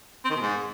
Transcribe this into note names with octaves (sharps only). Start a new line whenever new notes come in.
C4
D#3
B2
G#2